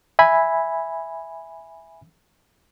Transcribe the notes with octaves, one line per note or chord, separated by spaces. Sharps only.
E5 G#5 B5